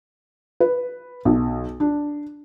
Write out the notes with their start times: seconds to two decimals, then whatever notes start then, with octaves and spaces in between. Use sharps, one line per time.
0.60 B4
1.25 B1
1.80 D4